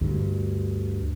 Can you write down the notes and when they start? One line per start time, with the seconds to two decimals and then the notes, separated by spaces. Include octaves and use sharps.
0.01 D2 G2